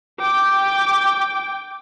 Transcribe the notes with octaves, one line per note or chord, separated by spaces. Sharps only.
G5 D6